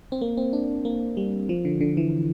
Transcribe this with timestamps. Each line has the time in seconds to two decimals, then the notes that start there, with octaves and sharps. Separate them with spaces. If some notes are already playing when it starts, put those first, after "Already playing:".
0.12 C4
0.21 A#3
0.37 C4
0.53 D4
0.85 A#3
1.17 G3
1.49 F3
1.65 D3
1.81 D3
1.97 E3